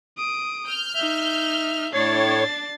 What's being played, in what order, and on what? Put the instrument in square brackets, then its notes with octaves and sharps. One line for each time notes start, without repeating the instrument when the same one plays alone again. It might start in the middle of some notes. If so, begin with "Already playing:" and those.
[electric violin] D#6 D7
[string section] F6 G6
[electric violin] D#4 E5
[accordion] A2 C#5 [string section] D4 [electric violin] A6 C7